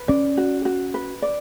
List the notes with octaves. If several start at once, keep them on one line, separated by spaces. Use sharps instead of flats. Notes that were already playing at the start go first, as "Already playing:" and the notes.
Already playing: B4
C#4 D5
F#4
F#4
B4
D5